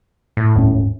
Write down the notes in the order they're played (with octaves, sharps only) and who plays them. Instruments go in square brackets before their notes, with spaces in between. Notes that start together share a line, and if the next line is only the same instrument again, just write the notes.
[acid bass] A2
[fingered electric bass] D#1 G#2 C#4